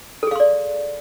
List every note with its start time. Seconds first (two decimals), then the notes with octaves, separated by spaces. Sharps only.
0.23 A4
0.27 G#4
0.31 F5
0.36 C6
0.40 D5